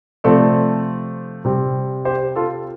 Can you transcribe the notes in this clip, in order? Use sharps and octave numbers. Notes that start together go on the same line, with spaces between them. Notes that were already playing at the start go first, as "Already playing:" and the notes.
C3 F3 A3 C4 A4 D5
C3 G3 C4
G4 C5
F4 A4